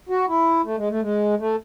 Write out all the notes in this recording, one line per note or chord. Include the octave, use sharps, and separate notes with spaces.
F#4
E4
A3
G#3
A3
G#3
A3